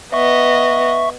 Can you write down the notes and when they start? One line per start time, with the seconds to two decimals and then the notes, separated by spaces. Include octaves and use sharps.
0.13 B3 D#5 E5 C#6